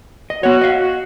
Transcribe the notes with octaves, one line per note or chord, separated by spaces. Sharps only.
D#5
B3 F#4 C#5
D#5 F5
F#4